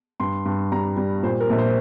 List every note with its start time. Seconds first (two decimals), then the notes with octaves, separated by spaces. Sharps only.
0.20 G2 C6
0.45 G2
0.72 G3 A#5
0.97 G3
1.23 A#2 C5
1.40 A#4
1.50 A#1
1.58 C5